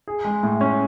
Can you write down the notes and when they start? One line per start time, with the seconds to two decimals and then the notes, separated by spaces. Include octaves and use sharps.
0.08 G#4
0.25 G#3
0.43 A2
0.61 C#4